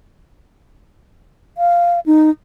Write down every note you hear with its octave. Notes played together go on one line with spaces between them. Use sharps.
F5
D#4